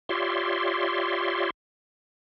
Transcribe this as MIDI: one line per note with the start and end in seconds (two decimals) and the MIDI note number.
0.09 1.50 65
0.09 1.50 67
0.09 1.50 73
0.09 1.50 74
0.09 1.50 76
0.09 1.50 84